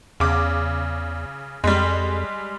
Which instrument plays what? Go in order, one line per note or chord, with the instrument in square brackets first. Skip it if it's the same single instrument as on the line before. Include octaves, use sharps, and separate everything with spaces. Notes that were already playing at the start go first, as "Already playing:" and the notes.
[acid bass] E2 [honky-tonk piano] C#3 D6
[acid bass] F2 [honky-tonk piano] G3 G#3